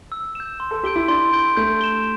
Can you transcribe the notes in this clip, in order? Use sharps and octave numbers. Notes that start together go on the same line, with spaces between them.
E6
G6 E7
C6
A4
G4 G6 D7 G7
E4
D4 C6
G6 D7 G7
A3 G6
E7 G7